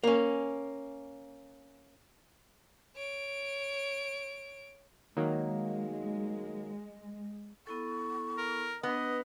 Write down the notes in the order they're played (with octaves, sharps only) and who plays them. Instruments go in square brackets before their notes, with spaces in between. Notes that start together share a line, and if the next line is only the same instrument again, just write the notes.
[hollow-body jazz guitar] A#3 C#4
[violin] C#5 D7
[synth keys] D#3 F#3 A#3 [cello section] G#3
[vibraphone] B3 E4 A4 [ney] C#6
[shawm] A#4
[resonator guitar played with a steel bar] B3 [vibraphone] D4 B4 [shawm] D#5